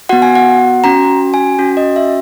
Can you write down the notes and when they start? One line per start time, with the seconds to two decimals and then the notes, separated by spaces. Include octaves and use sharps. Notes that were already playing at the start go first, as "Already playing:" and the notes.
0.09 B3 F#4 F#5
0.22 G#5
0.35 F#5
0.84 C#4 F#4 A#5
1.34 G#5
1.59 C#4 F#4
1.77 D#5
1.96 E5